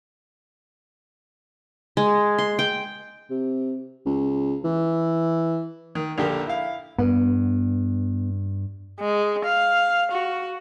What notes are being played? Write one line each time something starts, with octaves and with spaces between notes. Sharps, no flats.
G#3
C6
G5
C3
C#2
E3
D#3
A#1 D3 G4 A#4
E4 F5
G2 B3
G#3
F5
F#4